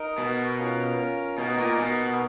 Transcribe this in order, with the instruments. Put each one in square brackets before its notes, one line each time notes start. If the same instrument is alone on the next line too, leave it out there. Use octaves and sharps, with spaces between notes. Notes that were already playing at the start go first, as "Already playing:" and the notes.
Already playing: [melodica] D#4 A#4 D#5
[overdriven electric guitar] B2
[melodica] C#4 F4 A#4
[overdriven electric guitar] B2 [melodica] D#4 A#4 D#5
[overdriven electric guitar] A#2
B2